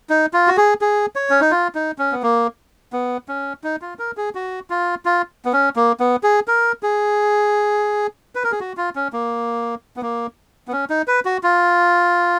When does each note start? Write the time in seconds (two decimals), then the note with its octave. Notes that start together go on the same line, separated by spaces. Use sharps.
0.09 D#4
0.33 F4
0.47 F#4
0.57 G#4
0.81 G#4
1.16 C#5
1.30 C#4
1.41 D#4
1.51 F4
1.75 D#4
1.98 C#4
2.12 B3
2.23 A#3
2.93 B3
3.28 C#4
3.64 D#4
3.82 F4
3.99 A#4
4.17 G#4
4.35 F#4
4.70 F4
5.05 F4
5.45 B3
5.53 C#4
5.76 A#3
6.00 B3
6.23 G#4
6.48 A#4
6.83 G#4
8.35 B4
8.44 A#4
8.52 G#4
8.60 F#4
8.77 F4
8.96 C#4
9.13 A#3
9.96 B3
10.02 A#3
10.68 B3
10.72 C#4
10.90 D#4
11.08 B4
11.25 F#4
11.43 F4